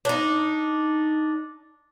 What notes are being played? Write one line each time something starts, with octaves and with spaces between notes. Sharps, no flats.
D4 D#4